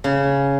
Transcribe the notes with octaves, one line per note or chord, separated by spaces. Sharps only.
C#3